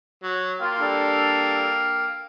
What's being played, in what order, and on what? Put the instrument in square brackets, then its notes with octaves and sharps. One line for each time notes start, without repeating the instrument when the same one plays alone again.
[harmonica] F#3
[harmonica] A#3 G5 F6 [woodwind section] F4
[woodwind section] G3 D4 A4